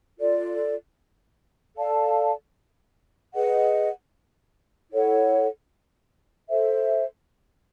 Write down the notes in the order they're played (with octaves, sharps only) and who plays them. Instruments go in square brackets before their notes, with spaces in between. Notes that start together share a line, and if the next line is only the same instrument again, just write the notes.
[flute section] F4 A4 D5
A4 D5 F5 A5
G#4 B4 D#5 F#5
E4 A4 C#5 F#5
A4 C5 E5